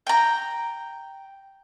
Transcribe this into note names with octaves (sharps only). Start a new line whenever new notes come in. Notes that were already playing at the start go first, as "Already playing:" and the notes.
G5 A#5